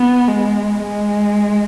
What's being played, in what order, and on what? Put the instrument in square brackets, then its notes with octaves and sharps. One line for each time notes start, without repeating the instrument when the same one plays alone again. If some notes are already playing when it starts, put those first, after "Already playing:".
Already playing: [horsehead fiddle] B3
G#3
G#3